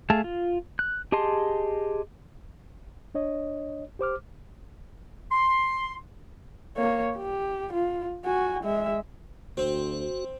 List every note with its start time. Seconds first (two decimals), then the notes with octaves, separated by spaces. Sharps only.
0.10 A3 G#4 E5 F5 A5
0.24 F4
0.79 F#6
1.12 G4 G#4 D#5 A5 C6
3.15 D4 C#5 D#5
3.99 G4 C5 D6 F6
5.32 C6
6.77 A#3 C#5
7.17 G4
7.73 F4
8.25 F#4 G#5
8.64 G#3 E5
9.57 D2 C4 F#4